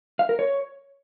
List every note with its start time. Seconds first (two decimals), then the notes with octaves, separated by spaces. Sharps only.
0.19 F5
0.29 A#4
0.39 C#5